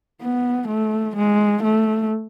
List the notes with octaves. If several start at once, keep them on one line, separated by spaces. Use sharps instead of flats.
B3
A3
G#3
A3